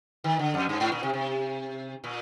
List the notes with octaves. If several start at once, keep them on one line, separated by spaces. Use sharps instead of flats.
D#3
D3
F2
G2
G#2
A#2
C3
C3
A#2